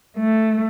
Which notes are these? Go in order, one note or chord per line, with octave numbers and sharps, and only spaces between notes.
A3